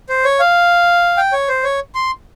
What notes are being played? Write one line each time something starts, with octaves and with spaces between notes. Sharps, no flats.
C5
C#5
F5
G5
C#5
C5
C#5
C6